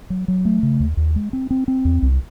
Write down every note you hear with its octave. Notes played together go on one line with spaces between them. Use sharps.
F#3
F#3
A3
C#3
D#2
D#2
G#3
C4
C4
C4
E2
C2